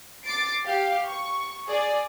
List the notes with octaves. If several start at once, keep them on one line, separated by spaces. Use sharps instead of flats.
D6 A6 C7 D7
G4 F5
C#6
G#4 D5